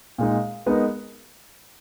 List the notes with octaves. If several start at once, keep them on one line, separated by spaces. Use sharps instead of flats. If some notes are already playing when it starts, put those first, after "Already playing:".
A#2 G#3 D#4
G#3 B3 D#4 A#4